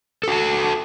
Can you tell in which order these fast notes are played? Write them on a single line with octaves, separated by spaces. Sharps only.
A4 F#4 A5